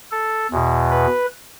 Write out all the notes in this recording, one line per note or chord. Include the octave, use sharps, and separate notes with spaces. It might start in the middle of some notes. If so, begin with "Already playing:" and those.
A4
E2 B2
B4